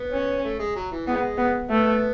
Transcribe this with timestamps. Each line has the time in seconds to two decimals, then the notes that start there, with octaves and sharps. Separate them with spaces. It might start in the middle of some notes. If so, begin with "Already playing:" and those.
Already playing: B3
0.12 C#4
0.43 A3
0.59 G#3
0.76 F#3
0.91 E3
1.06 E3 G#3 B3
1.38 B3
1.69 A3 B3